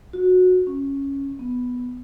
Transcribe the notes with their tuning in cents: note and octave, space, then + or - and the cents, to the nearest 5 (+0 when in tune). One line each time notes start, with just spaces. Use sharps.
F#4 -15
C#4 -5
B3 +0